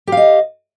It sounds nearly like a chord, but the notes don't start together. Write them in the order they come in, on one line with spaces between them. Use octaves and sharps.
G4 F5 D#5